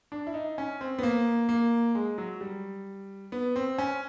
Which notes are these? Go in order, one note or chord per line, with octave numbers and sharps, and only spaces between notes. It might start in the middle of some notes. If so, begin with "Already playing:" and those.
D4
E4
D#4
C#4
C4
B3
A#3
A#3
G#3
F#3
G3
B3
C4
C#4